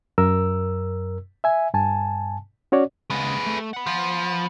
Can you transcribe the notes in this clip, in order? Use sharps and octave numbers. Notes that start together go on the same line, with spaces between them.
F#2 A#4 E6
E5 G#5
G2 G#5 A5
C#4 F#4 C#5 D5
C#3 G#3 G#4 B4
A3
F#5 B5
F3